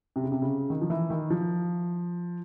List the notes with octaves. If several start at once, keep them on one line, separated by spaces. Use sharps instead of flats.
C3
C#3
C3
C#3
D#3
F3
E3
D#3
F3